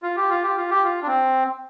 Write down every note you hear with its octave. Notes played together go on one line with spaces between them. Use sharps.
F4
G4
F4
G4
F4
G4
F4
D4
C4